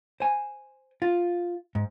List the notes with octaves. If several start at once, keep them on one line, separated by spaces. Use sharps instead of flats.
C5 G#5
F4
G#2